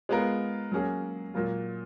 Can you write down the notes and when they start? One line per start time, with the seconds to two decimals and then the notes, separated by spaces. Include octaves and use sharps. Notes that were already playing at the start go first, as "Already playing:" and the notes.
0.09 G#3 B3 F4 A#4
0.72 F#3 A#3 C#4 G#4
1.34 A#2 F#3 A#3 F4